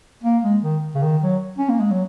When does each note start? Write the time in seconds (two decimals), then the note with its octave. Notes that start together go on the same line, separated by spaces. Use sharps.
0.24 A#3
0.43 G#3
0.63 D#3
0.95 C#3
1.03 D#3
1.23 F#3
1.58 C#4
1.69 A#3
1.80 G#3
1.91 F#3